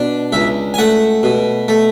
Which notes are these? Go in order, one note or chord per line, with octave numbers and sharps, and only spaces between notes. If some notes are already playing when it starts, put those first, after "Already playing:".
Already playing: B2 D4
C#2 E5
G#5
A3 F#5
B2
A3